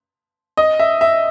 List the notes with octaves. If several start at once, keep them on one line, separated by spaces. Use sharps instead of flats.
D#5
E5
E5